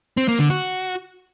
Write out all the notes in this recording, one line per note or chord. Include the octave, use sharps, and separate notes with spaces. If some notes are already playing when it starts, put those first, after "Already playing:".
C4
A#3
D3
F#4